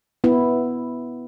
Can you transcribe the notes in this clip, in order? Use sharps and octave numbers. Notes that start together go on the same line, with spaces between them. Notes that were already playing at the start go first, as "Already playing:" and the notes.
B3 E4